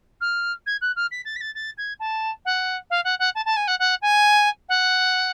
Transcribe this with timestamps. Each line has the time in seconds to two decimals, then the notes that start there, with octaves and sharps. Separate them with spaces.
0.21 F6
0.67 G#6
0.82 F#6
0.96 F6
1.11 B6
1.25 A6
1.36 B6
1.41 A6
1.55 A6
1.78 G#6
2.00 A5
2.45 F#5
2.90 F5
3.05 F#5
3.19 F#5
3.35 A5
3.46 A5
3.56 G#5
3.68 F#5
3.79 F#5
4.02 G#5
4.69 F#5